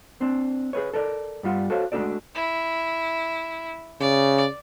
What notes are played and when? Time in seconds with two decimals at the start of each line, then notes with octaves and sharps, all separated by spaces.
0.21 C4 D4
0.73 G#4 A4 B4 C#5
0.94 A4 A#4 D5
1.43 G2 G3 F4 F#5
1.70 F#4 A4 C5 C#5 F5
1.92 G#3 A3 D4 F#4 A4 D5
2.35 E4
4.01 C#3 D5